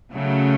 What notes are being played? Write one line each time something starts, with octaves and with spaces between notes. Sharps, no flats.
C#3 F#3 A3